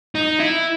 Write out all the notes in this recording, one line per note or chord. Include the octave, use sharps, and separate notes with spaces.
D#4
E4